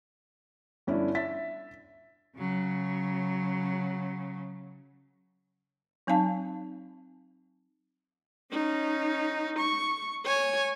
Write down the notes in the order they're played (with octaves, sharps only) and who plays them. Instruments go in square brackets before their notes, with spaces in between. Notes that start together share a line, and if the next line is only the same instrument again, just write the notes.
[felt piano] G1 C#4 D4 E4
E5 A6 B6
[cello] C#3 F#3
[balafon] F#3 C4 D#4 F5 A5
[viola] C#4 D#4
C#6
C#5 G#5